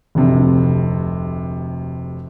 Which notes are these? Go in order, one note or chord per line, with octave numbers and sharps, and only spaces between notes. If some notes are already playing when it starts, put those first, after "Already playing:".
F1 D2 C3